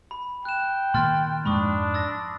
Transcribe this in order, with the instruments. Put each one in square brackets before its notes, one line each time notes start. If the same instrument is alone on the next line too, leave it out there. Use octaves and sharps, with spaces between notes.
[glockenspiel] B5
[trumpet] G5 [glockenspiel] F#6 E7
[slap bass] A#2 D#3 [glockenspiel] C6 F6 A6
[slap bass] F2 G#2 G#3 [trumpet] D4 [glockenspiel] B5 C#6 D#6
[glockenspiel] E6 A6 A#6